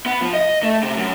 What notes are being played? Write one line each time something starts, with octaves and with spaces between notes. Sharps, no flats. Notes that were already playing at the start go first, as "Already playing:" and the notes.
B3
F3
D#5
A3
C3
F#2